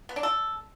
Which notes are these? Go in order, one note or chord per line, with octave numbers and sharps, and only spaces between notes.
B3
D4
A4